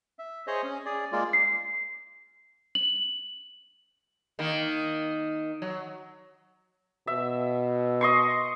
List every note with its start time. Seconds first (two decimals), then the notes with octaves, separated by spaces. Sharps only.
0.19 E5
0.47 G#4 C5 C#5 D#5
0.64 C#4
0.86 G#4 D5
1.12 G#3 A#3 F4 D5
1.33 C7
2.75 F#7
4.39 D#3 A#3
5.62 F#3
7.07 B2 E5
8.01 D#5 C6 C#6